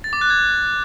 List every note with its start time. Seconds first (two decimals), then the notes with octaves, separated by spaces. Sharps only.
0.04 A6
0.13 D6
0.21 F#6
0.30 G#6